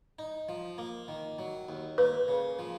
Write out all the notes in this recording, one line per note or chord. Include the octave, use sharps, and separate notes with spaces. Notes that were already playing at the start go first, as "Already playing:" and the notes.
D#4
F3
A#3
D#3
F#3
D#2
A#3 B4
C#3
F3